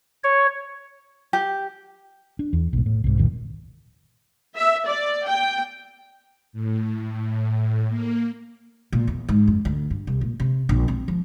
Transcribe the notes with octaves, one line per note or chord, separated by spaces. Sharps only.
C#5
G4
D4
E2
B1 G#2
A2
C2 G#2
F1 C2 A#2 D#3
E5
D5
G5
A2
A#3
A#2
E2
G#2
F#2
D2
G2
C2
A#2
C3
A#1
C4
F3